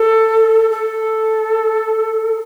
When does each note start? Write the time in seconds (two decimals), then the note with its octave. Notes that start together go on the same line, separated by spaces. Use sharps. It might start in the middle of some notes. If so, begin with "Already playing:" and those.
Already playing: A4
0.70 A4